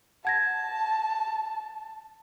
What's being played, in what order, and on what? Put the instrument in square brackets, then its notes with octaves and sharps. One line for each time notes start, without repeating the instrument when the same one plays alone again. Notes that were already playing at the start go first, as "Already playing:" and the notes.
[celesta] F#5 G#6 A#6 [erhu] A5